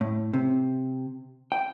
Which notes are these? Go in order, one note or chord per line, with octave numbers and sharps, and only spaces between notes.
A2
C3
G5